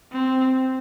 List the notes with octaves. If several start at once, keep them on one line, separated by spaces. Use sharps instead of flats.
C4